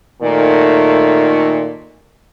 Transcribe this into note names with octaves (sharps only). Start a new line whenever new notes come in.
A#2 D#3 A3